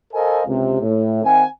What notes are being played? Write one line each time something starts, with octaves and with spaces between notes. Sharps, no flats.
A4 A#4 C5 D#5 F5 G#5
C#2 C3
A2
D#3 C4 E5 F#5 G#5